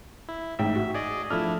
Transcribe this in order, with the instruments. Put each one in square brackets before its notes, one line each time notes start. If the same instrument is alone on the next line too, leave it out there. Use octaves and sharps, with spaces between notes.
[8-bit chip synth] E4
[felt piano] A1 G#2 G5 [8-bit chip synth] E5
[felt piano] F#4
[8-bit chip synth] G#4 D5 D#5
[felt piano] F3 A3 F6 [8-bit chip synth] D4 E4